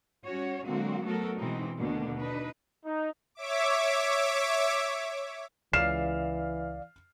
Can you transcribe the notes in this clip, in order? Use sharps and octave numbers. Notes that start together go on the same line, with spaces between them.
G3 C#4 F#4 C#5
D3 F#3 G#3 A#3 C4 F#4
F#3 A3 B3 F#4 A4 A#4
B2 E3 G#3 C4 D#4
D#2 B2 D3 A3 A#3 D4
D4 D#4 B4
D#4
C#5 E5 D6
C#2 C#3 E3 D5 F5 F6 C7 E7